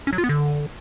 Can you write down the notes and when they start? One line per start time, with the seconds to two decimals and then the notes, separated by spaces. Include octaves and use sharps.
0.07 C#4
0.13 F#3
0.18 F4
0.24 B3
0.29 D3